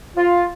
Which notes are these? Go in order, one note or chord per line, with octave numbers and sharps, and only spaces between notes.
F4